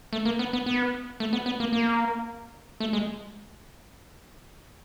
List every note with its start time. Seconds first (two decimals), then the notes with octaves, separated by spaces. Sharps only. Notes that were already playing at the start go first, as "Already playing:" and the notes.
0.13 A3
0.25 A#3
0.39 B3
0.53 B3
0.66 B3
1.20 A3
1.33 B3
1.46 B3
1.60 A#3
1.73 A#3
2.80 A3
2.93 G#3